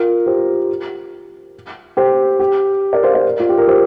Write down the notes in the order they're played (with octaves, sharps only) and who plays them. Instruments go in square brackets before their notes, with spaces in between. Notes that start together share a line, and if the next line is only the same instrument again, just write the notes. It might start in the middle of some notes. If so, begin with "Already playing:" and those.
Already playing: [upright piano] F4 A#4
G4 C5
G4 C5
G4
A#4 D5
C5 F5
A#4 D5
F4
G4
A#4
G4 C5